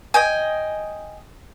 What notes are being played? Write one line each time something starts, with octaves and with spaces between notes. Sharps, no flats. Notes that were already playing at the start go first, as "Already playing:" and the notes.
D#5 G5 G#5